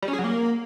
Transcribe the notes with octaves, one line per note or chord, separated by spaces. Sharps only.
G3
C#4
G#4
F#3
A#3